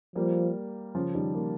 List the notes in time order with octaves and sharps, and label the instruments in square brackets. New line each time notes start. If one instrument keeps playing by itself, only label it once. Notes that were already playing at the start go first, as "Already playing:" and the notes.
[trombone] F3 [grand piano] G3 A#3
[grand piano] C#3 F3
D#3 G3
G3 A#3